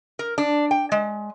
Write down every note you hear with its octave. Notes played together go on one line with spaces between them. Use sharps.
A#4
D4
G5
G#3